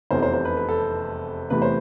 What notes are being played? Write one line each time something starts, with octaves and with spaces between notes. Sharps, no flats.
F1 E2 C3 C5
C5
C5
B4
B4
A4
E2 C3 E3 A3 B4
C5